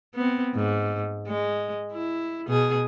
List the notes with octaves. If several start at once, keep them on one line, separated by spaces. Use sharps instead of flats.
B3 C4
G#2
G#3
E4
B2 G#4